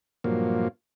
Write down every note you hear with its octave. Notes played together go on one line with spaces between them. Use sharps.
G2 A#2 F3 F#3 A#3